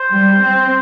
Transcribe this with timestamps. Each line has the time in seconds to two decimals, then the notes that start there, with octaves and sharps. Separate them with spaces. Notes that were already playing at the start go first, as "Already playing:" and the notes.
Already playing: C5
0.10 G3
0.40 C4